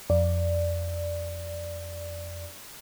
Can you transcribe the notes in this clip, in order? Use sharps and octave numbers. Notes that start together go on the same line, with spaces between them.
F2 D5